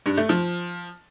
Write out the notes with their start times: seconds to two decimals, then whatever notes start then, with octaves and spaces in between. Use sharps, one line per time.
0.06 G2
0.17 A3
0.29 F3